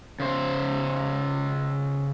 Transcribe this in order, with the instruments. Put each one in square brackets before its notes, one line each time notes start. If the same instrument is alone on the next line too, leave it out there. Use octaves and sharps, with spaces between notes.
[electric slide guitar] C#3 C5